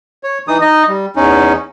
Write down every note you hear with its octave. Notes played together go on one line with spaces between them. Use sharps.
C#5
E3 D#4 D#6
D#4 D#5
G3
E2 C#4 D#4